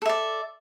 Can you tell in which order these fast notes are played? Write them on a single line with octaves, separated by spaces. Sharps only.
A4 E5 D5